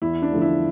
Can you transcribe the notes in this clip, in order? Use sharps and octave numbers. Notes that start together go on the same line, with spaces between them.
E2 E4
D4
D3 F3 A3
E4